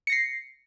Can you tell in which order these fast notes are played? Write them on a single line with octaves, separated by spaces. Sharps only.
C#7 A#6 C7